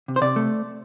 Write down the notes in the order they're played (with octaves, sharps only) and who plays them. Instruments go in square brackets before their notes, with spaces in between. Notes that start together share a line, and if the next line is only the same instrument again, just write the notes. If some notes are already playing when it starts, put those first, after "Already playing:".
[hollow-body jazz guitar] C3
C5
C3 D5
A3